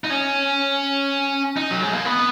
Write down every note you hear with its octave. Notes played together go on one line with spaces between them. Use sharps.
D#4
C#4
D#4
F#3
G#3
A#3
B3